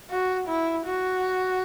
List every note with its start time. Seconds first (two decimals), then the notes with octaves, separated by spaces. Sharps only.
0.10 F#4
0.48 E4
0.85 F#4